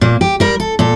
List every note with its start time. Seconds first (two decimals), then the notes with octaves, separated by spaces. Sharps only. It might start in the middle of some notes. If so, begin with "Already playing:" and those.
0.01 A#2 A#3
0.21 G4
0.40 G3 A#4
0.60 A4
0.79 A#2 A4